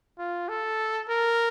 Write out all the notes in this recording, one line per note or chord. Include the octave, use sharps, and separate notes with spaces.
F4
A4
A#4